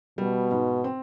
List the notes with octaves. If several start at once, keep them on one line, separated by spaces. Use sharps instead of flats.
B2 G3
G#2
C4